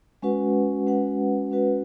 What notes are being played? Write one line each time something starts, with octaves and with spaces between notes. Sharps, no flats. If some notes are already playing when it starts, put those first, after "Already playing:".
G#3 C#4 F#4 B4 F#5
G#3 C#4 F#4 B4 F#5
G#3 C#4 F#4 B4 F#5